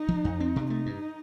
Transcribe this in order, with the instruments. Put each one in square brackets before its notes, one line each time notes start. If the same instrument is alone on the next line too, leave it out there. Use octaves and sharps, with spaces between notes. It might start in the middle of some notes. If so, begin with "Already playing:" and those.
Already playing: [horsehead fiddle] D#4
[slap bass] F3
F2
C4
C3
[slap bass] A3 [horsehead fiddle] D#4
[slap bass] G2